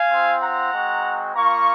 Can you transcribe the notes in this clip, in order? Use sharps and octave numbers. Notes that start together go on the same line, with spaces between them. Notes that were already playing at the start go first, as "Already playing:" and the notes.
Already playing: F5 G#5
C4 F4
F#5 A#5
G#3 C4 F#4
A#3 F4 A#5 C#6